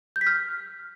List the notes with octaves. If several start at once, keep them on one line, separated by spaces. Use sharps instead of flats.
G6
B6
F6